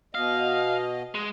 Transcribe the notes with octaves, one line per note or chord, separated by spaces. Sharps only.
B2 D#5 F5
G#3